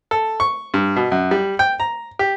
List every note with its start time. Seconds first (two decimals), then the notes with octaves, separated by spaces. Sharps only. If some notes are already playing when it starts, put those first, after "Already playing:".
0.11 A4
0.40 C#6
0.74 G2
0.96 B2
1.12 F#2
1.31 G3
1.59 G5
1.80 A#5
2.19 G4